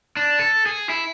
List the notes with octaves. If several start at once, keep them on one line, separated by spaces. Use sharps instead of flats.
D4
A4
G#4
E4